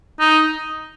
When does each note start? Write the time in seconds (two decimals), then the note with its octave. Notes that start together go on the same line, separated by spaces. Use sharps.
0.20 D#4